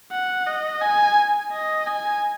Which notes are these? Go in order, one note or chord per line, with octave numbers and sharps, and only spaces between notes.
F#5
D#5
G#5
D#5
G#5